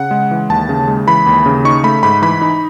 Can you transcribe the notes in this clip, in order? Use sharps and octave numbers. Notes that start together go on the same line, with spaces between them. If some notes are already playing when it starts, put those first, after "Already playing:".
Already playing: C#3 F#5
G#3
E3
D#2 A5
C#3
G#3
E3 B5
D#2
C#3
D#4 C#6
A3 B5
G#2 B5
E3 B5
D#4